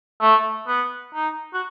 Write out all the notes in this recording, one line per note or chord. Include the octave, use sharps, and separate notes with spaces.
A3
B3
D#4
F#4